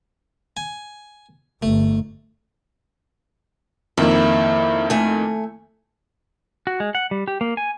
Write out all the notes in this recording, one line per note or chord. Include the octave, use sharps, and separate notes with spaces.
G#5
G1 A3
F2 D#3 A#3 E4
A3 G#5
F#4
G#3
F#5
G3
G4
A#3
G#5